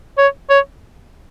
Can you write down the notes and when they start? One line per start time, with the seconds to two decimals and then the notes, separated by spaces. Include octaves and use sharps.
0.18 C#5
0.50 C#5